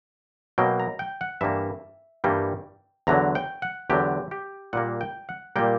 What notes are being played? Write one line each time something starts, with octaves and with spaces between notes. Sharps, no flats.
B2 F#3 A#3 G5
A#5
G5
F#5
G2 E3 G3 A#3 E5
G2 E3 G3 A#3 G5
E2 D3 F#3 A#5
G5
F#5
E2 D3 F#3 G4
G4
A#2 G3 A#3 F#5
G5
F#5
A#2 G3 A#3 G5